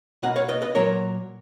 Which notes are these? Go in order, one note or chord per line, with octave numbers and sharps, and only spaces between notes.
B2 A#3 D#5 F#5
C#5 F5
B4 D#5
B4 D#5
A#2 F#3 A#3 A#4 C#5